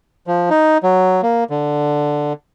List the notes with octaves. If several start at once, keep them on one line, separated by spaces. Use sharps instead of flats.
F3
D#4
F#3
A#3
D3